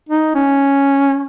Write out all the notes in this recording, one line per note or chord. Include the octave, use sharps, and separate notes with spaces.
D#4
C#4